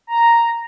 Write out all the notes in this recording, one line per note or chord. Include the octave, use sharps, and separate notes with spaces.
A#5